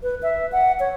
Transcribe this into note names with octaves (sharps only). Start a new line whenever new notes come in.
B4
E5
F#5
C#5